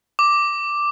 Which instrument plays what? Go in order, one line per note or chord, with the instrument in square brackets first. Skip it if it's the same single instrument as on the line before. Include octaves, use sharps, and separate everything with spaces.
[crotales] D6